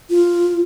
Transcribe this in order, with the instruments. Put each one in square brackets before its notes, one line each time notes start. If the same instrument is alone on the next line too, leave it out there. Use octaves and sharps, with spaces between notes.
[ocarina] F4